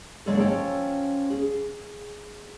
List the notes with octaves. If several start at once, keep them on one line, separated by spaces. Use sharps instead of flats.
D3 F#3 G#3 A#3 G#4 A4
F3 C#4 A4 G5
G#4